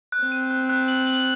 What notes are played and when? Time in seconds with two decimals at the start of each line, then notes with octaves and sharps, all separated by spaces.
0.12 F#6
0.22 C4
0.32 D#7
0.50 F#6
0.69 F#6
0.88 F#7
1.07 F#7